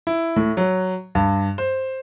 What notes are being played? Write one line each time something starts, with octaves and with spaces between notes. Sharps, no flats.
E4
A2
F#3
G2
C5